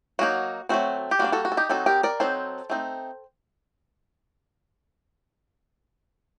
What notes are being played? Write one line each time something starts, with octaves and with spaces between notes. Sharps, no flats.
F#3 A#3 D#4 F#4
F#3 A3 C4 F#4
G4
G3 A#3 D4 F#4
F#4 A4
F#4
A4
D#4 G4
F#3 C4 D#4 F#4 A4
G4 A#4
A#4 D5
F#3 C4 D#4 A4 C5
A3 C4 D#4